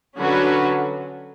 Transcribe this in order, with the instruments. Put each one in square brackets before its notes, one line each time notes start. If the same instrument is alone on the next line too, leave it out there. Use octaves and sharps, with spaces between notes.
[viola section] D3 F#3 C#4 F#4 B4